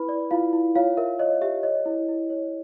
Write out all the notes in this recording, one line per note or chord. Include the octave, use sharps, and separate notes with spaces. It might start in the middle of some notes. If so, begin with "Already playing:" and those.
Already playing: E4 B4 B5
D5
E4 F4 F5
E4
F4 C#5 F5
A#4 E5
C#5 D#5
G4 E5
C#5 D#5
E4
E4
C#5